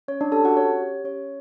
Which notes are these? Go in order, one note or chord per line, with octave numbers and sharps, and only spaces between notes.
C#4 C#5
D4 D5
G4 A4 A5
F#4 F#5
C#4 C#5
G4
C#4 C#5